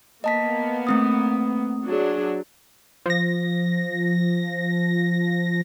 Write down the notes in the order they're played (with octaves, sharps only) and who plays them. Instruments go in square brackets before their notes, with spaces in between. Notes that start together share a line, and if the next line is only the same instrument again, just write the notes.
[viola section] A#3 B3 [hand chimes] D#5 A5 B6
[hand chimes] A3 C4 D#6
[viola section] F#3 D4 G#4
[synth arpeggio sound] F3 A#6